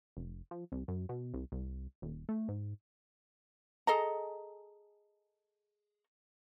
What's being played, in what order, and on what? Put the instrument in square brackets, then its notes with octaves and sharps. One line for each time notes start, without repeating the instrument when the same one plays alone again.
[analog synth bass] F1
F3
C2
F#2
B2
C2
C2
D#1
A3
G#2
[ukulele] G#4 A4 D#5 A#5